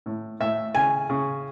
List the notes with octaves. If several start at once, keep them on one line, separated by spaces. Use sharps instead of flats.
A2
A2 E5
C#3 G#5
C#3